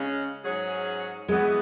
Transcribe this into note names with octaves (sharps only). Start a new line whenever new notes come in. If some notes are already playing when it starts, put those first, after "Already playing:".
Already playing: C#3 G#3 C#4
G#2 F#3 C#4 G#4
E2 E3 G#3 B3 F#4